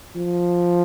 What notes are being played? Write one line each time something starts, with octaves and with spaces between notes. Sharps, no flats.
F3